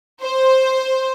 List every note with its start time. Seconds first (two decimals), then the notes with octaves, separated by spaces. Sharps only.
0.22 C5